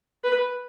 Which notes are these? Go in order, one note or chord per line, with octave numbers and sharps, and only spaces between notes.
B4